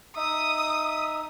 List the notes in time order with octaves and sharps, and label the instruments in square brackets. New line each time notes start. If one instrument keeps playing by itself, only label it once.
[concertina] D#4 E5 [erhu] D#6